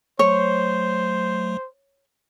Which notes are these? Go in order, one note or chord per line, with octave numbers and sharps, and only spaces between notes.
F#3 A3 C5 C#5